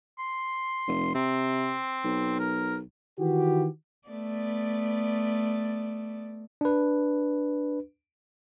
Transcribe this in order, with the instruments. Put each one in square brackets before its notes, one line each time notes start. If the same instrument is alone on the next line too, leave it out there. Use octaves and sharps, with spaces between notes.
[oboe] C6
[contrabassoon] F1
[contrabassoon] C3 [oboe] C4
[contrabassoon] B1
[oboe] A#4
[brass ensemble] D#3 E3 F#4 G4
[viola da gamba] A3 B3 D5
[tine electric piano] D4 B4